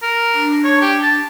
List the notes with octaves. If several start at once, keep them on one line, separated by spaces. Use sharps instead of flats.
A#4
D4
C#5
G4
A5